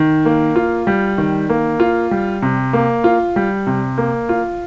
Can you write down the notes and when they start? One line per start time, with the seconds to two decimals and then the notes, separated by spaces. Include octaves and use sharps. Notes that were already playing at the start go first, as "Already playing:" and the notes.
Already playing: D#3
0.25 A#3
0.56 F4
0.87 G3
1.18 D#3
1.49 A#3
1.80 F4
2.11 G3
2.42 C3
2.73 A#3
3.04 F4
3.36 G3
3.67 C3
3.98 A#3
4.29 F4